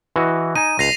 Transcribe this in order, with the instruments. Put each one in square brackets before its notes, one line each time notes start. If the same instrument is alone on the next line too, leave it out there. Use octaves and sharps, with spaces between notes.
[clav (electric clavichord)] E3 F#4 D#5
[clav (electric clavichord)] D#4 G#5 [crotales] D#7
[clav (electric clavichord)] C#2 [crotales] A#6 C7 F7